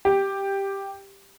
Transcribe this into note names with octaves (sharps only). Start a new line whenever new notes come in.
G4